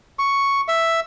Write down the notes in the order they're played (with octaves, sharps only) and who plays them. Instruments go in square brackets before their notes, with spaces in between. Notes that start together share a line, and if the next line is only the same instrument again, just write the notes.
[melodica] C#6
E5